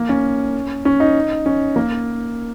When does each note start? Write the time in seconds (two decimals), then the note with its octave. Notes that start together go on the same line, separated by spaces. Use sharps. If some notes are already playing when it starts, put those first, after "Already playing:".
Already playing: A#3
0.09 C#4
0.85 C#4
1.00 D#4
1.46 C#4
1.76 A#3